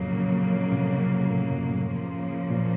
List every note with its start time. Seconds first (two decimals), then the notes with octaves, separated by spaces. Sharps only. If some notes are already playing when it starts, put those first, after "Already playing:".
Already playing: F2 A2 C#3 F#3 A#3
0.12 A#2
0.72 A2 C3
1.31 A2
1.51 F#2
1.71 A2
1.91 C#3 F3 A#3
2.50 A#2